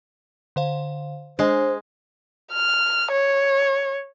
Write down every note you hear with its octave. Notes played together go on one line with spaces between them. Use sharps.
D3 C5 F5
G#3 D4 C5 D#5 G#5
F6
C#5